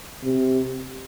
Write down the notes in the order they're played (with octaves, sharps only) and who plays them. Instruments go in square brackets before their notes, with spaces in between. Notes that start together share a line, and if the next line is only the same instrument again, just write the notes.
[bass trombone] C3